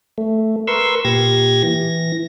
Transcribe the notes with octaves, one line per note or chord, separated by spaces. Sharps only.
A3
A#4 B4 C6 C#6 E6
A#2 G4 G#6 A#6
E3 A#6